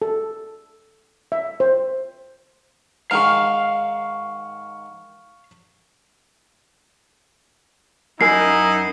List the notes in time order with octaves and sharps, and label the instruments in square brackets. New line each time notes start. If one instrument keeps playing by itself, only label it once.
[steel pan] A4
E5
C5
[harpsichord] G#2 D#3 [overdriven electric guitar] F5 [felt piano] C#6 F6
[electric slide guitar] F#2 A#4 G#5 [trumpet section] D#4 [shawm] E4 [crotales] C7